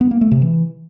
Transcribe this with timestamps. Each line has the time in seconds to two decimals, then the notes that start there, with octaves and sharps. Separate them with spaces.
0.01 B3
0.11 A#3
0.21 A3
0.32 C3
0.42 E3